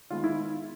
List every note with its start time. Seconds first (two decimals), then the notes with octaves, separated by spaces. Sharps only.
0.10 D#3 G#3 B3 F4
0.24 E4